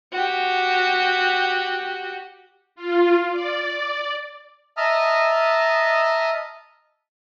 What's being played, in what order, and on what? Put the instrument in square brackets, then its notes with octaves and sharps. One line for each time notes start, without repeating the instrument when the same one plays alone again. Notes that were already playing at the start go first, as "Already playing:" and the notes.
[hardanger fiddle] F#4 G4
[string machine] F4
D5
[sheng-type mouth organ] D#5 E5 A5 A#5 D#6 F6